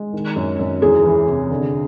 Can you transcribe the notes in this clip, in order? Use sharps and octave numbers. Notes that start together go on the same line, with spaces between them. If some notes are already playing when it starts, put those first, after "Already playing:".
Already playing: G#3
D#3
F#2
F#2
E2 G#4
E3
C3
D3